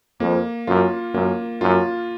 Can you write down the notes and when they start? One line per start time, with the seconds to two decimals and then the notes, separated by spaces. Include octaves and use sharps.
0.20 F2 A#3
0.67 F#2 F4
1.14 F#2 A#3
1.61 F#2 F4